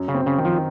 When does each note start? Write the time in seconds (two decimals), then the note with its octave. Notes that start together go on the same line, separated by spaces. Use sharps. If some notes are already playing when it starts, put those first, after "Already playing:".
Already playing: F#2
0.08 C#3
0.14 C4
0.26 C#3
0.38 D#3
0.45 F3